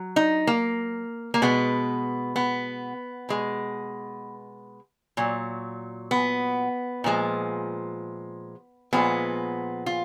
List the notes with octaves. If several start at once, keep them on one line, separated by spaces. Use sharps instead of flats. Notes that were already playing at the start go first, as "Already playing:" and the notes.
Already playing: F#3
D#4
A#3
A#3
B2 G#3 B3
B3
B2 G#3
A#2 F#3
B3
A#2 F3 G#3
A#2 F3 G#3 B3
F4